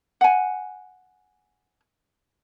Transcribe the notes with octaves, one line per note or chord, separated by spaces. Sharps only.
F#5 G#5